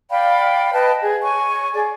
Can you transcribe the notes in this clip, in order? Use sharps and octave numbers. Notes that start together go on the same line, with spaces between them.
D5 F5 G5 B5
B4 D#5 G5 A5
G#4
C#5 G#5 C#6
G#4 D5